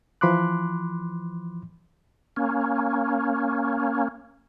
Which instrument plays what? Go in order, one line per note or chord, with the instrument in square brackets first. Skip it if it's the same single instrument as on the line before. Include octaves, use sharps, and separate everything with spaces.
[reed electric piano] E3 F3 B5 C6 D6 F#6
[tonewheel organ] A#3 C#4